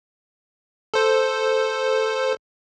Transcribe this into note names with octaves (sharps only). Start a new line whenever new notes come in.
A4 C5